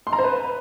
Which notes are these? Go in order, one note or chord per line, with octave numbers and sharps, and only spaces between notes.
C6
A#5
C5
B4